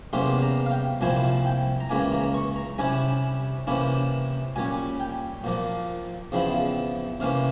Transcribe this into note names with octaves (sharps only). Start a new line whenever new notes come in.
E2 C3 G3 A#3 C#4 C6
A#5
F5
G5
C2 A#2 F3 C4 E4 G#5
G5
A#5
C#2 C#3 E3 A#3 G#5
A#5
C#6
A#5
C3 G3 C#4 E4 G#5
C3 E3 A#3 C#4 E4
A#2 G3 C#4 G#5
G5
A#2 F3 A#3
E2 C#3 F3 C4 E4
C3 E3 A#3 C#4 F5